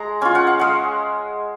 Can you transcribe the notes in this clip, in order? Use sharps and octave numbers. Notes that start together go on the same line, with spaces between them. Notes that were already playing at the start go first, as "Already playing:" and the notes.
Already playing: G#3 A#5
C#4 F4 G#5
F#5
F5
G#3 F#5